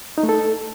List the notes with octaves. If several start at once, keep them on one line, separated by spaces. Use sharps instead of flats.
D#4
A3
A4